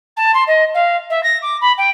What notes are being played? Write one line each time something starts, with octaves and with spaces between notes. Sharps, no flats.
A5
C6
D#5
F5
E5
A#6
D6
B5
G5